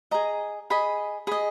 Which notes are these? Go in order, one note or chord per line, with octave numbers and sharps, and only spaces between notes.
G#4 D#5 A#5
G#4 D#5 B5
G#4 D#5 B5